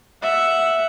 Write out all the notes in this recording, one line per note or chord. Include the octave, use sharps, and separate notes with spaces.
E5 F#5